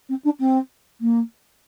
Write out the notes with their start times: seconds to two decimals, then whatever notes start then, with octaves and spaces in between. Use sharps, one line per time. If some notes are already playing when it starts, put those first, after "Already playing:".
0.09 C4
0.25 D4
0.40 C4
1.01 A#3